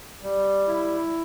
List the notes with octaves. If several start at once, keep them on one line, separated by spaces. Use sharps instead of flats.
G3
E4